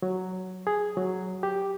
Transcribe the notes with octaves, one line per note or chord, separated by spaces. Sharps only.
F#3
G#4
F#3
G4